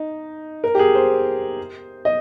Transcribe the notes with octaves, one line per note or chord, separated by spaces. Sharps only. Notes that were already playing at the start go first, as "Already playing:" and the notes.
Already playing: D#4
A#4
G4
G#4
C5
D#5